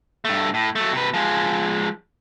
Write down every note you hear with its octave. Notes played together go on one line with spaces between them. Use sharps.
G2 A3
A2
F#3 A3
C3 B4
F3 G#3